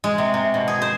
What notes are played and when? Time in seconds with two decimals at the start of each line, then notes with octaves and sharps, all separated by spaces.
0.04 G#3
0.18 C3
0.34 C3
0.54 B2
0.68 G#4
0.82 C5